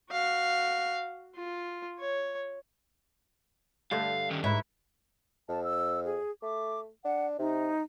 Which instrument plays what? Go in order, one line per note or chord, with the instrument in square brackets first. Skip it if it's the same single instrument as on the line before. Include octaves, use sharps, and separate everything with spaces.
[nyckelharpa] F#4 F5
F4
C#5
[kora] G2 D3 A3 [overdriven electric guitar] F5
[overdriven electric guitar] D#3 C#4
[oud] G#2 [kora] E4 B4 C#5 [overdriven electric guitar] E5
[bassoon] F2 [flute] A5
[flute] E6
G#4
[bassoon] A3 [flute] D6
[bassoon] D4 [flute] F#5
[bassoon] C3 [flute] D#4